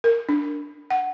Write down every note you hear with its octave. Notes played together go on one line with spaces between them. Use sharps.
A#4
D4
F#5